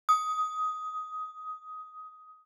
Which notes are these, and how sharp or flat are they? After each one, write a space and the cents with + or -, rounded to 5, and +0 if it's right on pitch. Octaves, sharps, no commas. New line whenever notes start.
D#6 +15